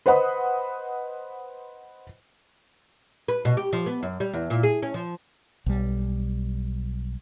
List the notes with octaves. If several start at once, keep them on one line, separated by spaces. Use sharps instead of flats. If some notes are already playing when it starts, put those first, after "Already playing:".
B4 C5 D#5 F#5 B5 D#6
B4
B2
G4
F3
B3
F#2
G3
E2
A#2
G#4
C#4
F3
B1 G3